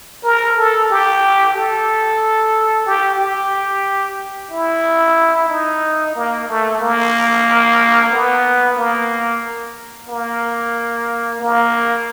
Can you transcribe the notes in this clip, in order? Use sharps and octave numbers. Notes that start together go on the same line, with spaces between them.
A#4
A4
G4
A4
G4
G4
E4
D#4
A#3
A3
A#3
B3
A#3
A#3
A#3